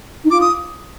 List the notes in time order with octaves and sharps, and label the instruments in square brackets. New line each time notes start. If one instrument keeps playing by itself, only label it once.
[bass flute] D#4
[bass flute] F4 [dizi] D6
[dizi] D#6